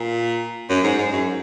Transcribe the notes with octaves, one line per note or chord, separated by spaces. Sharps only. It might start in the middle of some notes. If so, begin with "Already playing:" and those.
Already playing: A#2
F#2
G#2
G#2
F#2